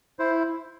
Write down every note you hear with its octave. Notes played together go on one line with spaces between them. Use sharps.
E4 C5